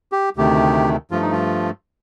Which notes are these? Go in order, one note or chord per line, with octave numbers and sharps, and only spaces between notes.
G4
D2 C3 D#3 A3 G4
G2 F3 A3 F4
D#4
F4